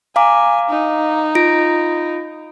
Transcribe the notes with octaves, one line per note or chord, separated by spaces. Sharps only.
F5 G#5 A#5 D6
D#4
F4 A#6 D7